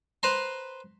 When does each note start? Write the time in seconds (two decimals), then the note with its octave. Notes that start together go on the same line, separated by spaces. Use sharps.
0.23 B4 C5 A#5 C6